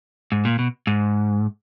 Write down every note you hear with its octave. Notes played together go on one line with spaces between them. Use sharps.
G#2
A#2
B2
G#2